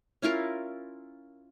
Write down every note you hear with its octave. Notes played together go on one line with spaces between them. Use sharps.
C#4 E4 F4 A#4